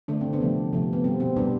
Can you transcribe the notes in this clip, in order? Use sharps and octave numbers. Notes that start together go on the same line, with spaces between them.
D3 A3 D4
C4
B3 D4
C3 F3 A3
C3 F3 A3
B3
B2 G3 C4
C4
B2 G3 B3 D4